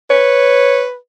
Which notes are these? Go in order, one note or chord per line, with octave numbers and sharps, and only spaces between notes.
B4 C#5